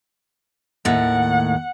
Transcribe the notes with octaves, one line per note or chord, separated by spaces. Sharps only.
D#2 A2 F#5